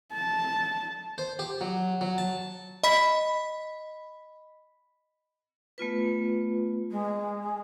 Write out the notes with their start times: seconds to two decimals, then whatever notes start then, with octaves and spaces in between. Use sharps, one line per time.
0.14 A5
1.18 C5
1.39 G4
1.61 F#3
2.01 F#3
2.18 A5
2.83 D#5 B5 B6
5.78 A3 B3 F4 B4
6.90 G#3